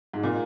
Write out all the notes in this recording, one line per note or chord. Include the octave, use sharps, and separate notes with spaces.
G#2
A#2